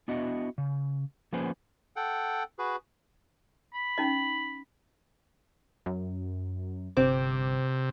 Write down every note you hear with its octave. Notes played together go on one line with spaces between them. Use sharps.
B3 D4 E4 F#4 D#5
C#3
F3 A#3 C#4 G#4 B4 C5
A4 F#5 G5
F#4 G#4 B4
B5
C#4 D#4 D#5
F#2
G1 C3 C4 D6